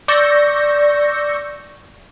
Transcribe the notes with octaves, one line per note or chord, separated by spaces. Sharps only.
D5 C#6 E6 G6 A#6